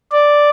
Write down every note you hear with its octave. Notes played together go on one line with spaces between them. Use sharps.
D5